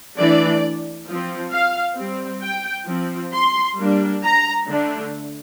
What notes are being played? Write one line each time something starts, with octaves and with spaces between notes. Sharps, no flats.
E3 A3 D4 D5
F3 C4
F5
G3 C4
G5
F3 C4
C6
G3 A#3 D4
A#5
D3 A3 D4